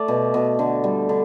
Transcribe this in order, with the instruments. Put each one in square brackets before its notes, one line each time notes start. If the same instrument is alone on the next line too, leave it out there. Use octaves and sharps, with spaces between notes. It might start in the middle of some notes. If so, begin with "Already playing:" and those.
Already playing: [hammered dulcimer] A3 D5
B2
B2
D3
G3
D3